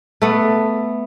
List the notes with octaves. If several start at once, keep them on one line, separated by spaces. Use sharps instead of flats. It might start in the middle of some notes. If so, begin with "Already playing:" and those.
A3 B3